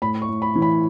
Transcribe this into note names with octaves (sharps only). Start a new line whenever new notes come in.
A2 B5
C#6
A2
B5
E3
B5